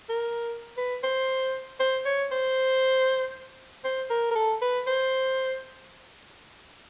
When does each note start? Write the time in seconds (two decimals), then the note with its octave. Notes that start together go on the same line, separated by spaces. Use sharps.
0.09 A#4
0.77 B4
1.03 C5
1.80 C5
2.05 C#5
2.32 C5
3.84 C5
4.10 A#4
4.31 A#4
4.36 A4
4.62 B4
4.87 C5